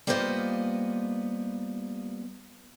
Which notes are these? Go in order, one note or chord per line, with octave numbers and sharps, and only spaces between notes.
G3 A#3 B3 F4 C5 D#5